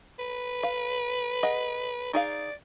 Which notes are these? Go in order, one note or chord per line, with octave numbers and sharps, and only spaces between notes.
B4
F5
G#4 D#5 F#5
D#4 G#4 D5 F5